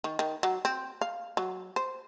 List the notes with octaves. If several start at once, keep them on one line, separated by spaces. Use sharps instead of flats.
D#3
D#3
F#3
C4
F5
F#3
C5